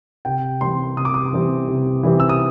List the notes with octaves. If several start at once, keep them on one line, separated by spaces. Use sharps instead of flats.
C3 G5
E3 G3 C4 C6
C3 D#6
D6
D#6
E3 G3 C4
C3
E3 G3 C4
E6
D#6